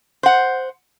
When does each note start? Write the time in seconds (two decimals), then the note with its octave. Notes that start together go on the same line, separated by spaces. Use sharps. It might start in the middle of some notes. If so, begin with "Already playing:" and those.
0.23 C5 F#5